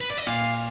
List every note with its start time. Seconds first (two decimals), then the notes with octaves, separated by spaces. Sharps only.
0.01 B4
0.10 D5
0.18 D#5
0.27 A#2 F5